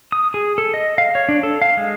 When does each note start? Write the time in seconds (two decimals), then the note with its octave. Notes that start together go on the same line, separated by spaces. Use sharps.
0.12 D#6
0.34 G#4
0.58 A4
0.74 D#5
0.98 F5
1.15 C#5
1.29 D4
1.43 A4
1.62 F5
1.77 G#3